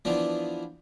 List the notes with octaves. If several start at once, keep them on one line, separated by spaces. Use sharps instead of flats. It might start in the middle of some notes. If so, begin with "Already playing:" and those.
E3 F3 B3 D4